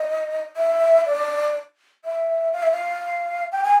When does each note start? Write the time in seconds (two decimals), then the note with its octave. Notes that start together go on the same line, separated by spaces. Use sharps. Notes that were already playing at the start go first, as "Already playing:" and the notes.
Already playing: D#5
0.56 E5
1.05 D5
2.04 E5
2.53 F5
2.62 E5
2.71 F5
3.52 G5
3.63 G#5